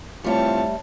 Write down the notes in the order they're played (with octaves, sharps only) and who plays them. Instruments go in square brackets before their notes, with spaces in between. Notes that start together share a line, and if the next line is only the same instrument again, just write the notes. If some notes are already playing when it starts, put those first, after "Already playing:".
[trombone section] E3 C4 F4 [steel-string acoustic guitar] G3 A3 [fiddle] C#5 A5